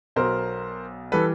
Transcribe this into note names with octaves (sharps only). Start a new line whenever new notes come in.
B1 B2 F#3 A#4 C5
E3 G3 A4 B4